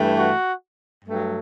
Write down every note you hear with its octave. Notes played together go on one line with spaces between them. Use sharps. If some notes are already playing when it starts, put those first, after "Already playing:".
Already playing: G2 E3 A3
F#4
G2 F#3 A3